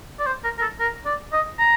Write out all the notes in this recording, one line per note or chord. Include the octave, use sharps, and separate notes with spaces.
D5
C5
A#4
A#4
A4
A#4
D5
D#5
A#5